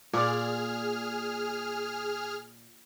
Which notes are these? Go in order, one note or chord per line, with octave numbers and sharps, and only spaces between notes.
A#2 G#4 D5 F6